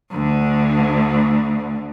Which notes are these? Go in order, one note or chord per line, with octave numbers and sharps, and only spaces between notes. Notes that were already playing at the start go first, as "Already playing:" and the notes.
D2 D3